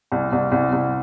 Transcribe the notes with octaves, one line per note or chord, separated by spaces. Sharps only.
C2
C2
C2
C2